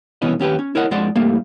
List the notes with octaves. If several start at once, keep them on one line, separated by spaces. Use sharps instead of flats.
C2 B2 E3 C#4 D#5
D#2 C#4 G4 B4
C#4
E4 A#4 C#5 D#5 F#5
F2 F3 G#3 D5 F#5 C6
C2 G2 G3 A3 A#3